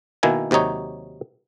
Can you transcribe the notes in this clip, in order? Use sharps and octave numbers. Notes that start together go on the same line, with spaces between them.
B2 D#3 A#3 E4 G#5
D#2 C3 F#3 D#4 C#5